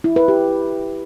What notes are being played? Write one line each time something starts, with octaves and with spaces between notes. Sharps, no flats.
E4
B4
G4